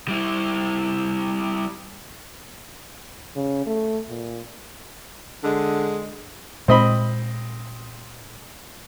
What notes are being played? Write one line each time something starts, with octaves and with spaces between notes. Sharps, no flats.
G3 E4
C#3
A3
A#2
D3 G#3
A#2 G#3 C4 D#5 B5